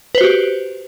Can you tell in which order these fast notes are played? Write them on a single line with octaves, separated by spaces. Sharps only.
B4 C5 F#4 G4